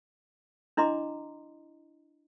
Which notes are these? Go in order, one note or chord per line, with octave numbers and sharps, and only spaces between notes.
D4 E4 D#5 A#5 C6 D6